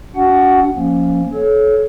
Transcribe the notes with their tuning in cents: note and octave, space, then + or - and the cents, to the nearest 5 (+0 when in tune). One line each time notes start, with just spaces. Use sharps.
D4 -45 F#4 +15 F#5 +10
F3 +0 A#3 +0 C#4 +0
A4 -35 C#5 +0